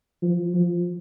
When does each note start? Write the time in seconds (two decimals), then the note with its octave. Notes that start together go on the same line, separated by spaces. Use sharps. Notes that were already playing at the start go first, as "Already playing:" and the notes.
0.23 F3
0.54 F3